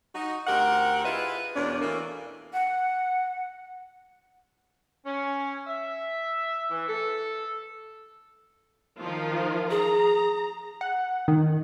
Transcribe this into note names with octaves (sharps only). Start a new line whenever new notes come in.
D#4 F#4
D2 C4 G4 A#4 F#5
E4 F4 G#4 B4 D#5 E5
E2 B2 A#3 C#4 D4
B2 E3 A3 A#3
F#5
C#4
E5
E3
A4
D#3 F3 F4
G#4 A#5
F#5
D#3